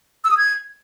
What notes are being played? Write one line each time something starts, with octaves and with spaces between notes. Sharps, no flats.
E6
D#6
G#6